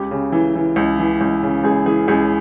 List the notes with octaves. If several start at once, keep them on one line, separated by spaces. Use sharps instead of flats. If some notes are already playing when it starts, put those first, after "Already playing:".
Already playing: C#2 G4
C#3
E3
E3
C#2
E3
C#2
C#3
C#2 G#4
E3 G#4
C#2 G#4